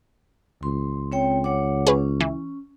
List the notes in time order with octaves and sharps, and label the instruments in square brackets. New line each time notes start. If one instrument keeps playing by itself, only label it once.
[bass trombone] C#2 [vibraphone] C6
[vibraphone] C4 C#5 G5
C#5 F#5 D6
[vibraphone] C#4 [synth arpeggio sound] G#4 B4 C#5
[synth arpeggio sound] E3